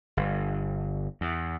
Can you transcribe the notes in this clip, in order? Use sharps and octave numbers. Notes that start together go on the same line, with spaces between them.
G1
E2